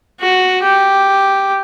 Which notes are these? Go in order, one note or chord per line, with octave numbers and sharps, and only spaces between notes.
F#4
G4